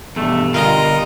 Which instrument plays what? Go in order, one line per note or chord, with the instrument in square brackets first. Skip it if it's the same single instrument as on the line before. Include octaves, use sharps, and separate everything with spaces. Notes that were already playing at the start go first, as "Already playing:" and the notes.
[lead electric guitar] E2 [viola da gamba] G2 B2 [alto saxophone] A3
[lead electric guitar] D3 [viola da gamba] G3 [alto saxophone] F4 [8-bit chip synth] A#4 D#5 A#5